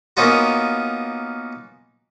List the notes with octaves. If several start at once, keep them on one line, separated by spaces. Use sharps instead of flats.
A#3 B3 C#4 D#4 F4 F#4